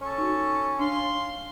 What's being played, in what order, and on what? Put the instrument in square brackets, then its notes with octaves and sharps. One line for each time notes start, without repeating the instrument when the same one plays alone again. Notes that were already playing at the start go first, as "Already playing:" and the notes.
[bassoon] C#4 [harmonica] A4 C#6
[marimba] D#4 F#4
[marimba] D4 [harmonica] F5 C6